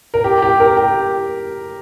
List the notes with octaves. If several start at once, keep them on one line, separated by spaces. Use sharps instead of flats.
A#4
G4
G4
A#4
G4